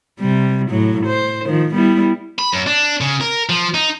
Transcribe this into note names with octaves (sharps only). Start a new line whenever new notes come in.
C3 G3
A2 F#3
C5
D#3 F3
G3 B3 E4
B5
F#2
D4
C#3
A#4
F3
D#4